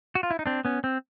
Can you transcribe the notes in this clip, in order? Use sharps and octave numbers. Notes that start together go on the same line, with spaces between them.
F#4
F4
E4
D#4
C4 D4
B3 C#4
C4